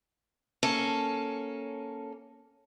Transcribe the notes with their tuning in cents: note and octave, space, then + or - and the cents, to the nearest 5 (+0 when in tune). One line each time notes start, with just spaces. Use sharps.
A#3 +0 C#4 +0 A4 +0